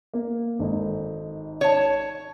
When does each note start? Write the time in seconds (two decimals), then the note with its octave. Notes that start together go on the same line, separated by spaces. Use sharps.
0.14 A#3
0.59 G#1 D#4 A4
1.61 C#5 A5